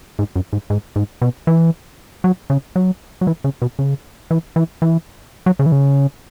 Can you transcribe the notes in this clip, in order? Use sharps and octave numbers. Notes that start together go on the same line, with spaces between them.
G#2
F#2
G#2
G#2
G#2
B2
E3
F#3
C#3
F#3
F#3
E3
C#3
B2
C#3
E3
E3
E3
F#3
C#3
E3
C#3